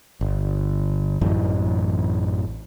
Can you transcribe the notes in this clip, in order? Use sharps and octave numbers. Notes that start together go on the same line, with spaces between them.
G1
A1 F#2 E3